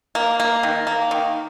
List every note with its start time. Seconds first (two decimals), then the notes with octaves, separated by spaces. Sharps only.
0.15 A#3
0.40 A#3
0.63 D#3
0.87 A#3
1.11 D#3